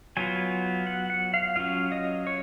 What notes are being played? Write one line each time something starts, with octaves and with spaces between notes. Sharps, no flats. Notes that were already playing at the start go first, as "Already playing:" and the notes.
F#3 B3 F4 G#5
F#5
F#5
F5
F#3 C#4 F4 F5
D#5
C#5